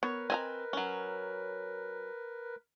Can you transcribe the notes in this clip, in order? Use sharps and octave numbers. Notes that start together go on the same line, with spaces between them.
B3 A#4 B4 C#5
C4 D#5 E5 G#5 A#5
F#3 C#4